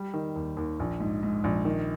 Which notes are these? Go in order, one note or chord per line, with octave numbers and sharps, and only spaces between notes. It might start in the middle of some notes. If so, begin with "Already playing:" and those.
Already playing: G3
D#3
D#2
D#2
A#1
G#2
G#2
A#1
D#3